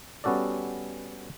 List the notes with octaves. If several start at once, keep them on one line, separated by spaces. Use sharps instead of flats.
G3 B3 C#4 F#4 A4 D5